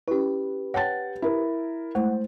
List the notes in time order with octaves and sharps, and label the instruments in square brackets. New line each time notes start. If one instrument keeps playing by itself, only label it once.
[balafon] C#4 E4 [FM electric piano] G4 B4
[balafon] C#5 G5 A5 [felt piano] F#5 A6
[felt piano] E4 A#4
[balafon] G#3 A3 E4 [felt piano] C5 [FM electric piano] F#5